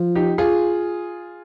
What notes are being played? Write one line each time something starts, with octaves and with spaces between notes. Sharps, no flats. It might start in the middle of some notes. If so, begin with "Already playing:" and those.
Already playing: F3
D#4 G4
F4 G#4